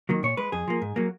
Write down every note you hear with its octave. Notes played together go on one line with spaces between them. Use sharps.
D#3 F#3 A#3
A#2 C#5
G#3 B4
F2 G#4
F3 A#3
G#2
F#3 A#3